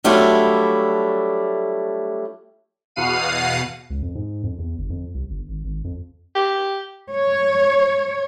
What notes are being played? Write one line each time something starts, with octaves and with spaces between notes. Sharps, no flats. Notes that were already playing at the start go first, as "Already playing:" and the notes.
F#3 G3 A3 D4 E4 F4
E2 B2 F5 F#5 C7 D#7
C#2
F2
G#2
F2
E2
G1
F2
C2
G1
G#1
G#1
F2
G4
C#5